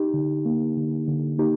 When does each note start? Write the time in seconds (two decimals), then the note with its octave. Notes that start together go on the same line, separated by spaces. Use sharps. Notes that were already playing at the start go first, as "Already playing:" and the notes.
Already playing: D#4 G4
0.14 D3
0.45 A#3
0.77 D3
1.07 D3
1.38 A#3 D#4 G4